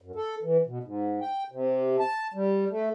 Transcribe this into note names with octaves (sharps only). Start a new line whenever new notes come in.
F#2
A4
E3
B2
G#2
G5
C3
A5
G3
A3